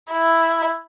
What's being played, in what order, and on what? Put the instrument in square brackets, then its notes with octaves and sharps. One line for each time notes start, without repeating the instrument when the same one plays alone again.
[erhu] E4